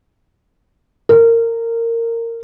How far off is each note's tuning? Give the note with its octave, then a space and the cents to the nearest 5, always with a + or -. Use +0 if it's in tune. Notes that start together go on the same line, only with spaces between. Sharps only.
A#4 -20